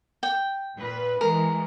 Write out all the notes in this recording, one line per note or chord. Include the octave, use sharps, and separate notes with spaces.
G5
A#2 B4
E3 G#3 A#4